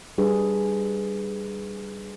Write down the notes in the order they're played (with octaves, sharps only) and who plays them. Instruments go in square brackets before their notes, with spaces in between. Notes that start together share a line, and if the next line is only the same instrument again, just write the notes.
[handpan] G3 D4 G#4 B4